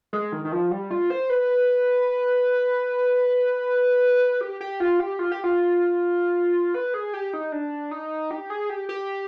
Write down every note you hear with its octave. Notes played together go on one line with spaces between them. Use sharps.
G#3
D#3
D#3
F3
G3
F4
C5
B4
G4
G4
F4
G4
F4
G4
F4
B4
G#4
G4
D#4
D4
D#4
G4
G#4
G4
G4